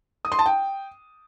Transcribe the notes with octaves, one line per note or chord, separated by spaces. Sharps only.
D#6
C6
A5
G5